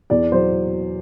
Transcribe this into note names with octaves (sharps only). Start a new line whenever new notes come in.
E2 D5
F#3 C5